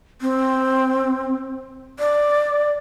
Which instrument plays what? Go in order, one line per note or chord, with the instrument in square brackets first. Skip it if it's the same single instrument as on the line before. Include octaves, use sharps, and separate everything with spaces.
[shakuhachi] C4
D5